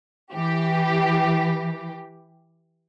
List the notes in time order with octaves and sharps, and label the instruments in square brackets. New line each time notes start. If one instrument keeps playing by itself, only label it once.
[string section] E3 G4